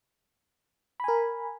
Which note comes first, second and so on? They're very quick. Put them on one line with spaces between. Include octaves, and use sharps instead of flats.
B5 G#5 A#4